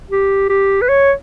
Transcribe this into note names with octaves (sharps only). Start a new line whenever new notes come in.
G4
G4
B4
C#5